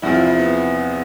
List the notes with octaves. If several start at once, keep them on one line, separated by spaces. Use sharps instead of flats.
E2 C3 F3 E4
F4
E4
B3